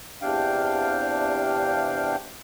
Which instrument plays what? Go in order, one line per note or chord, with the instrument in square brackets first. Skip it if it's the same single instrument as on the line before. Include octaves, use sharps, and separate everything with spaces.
[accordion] E2 C3 D4 F5 G5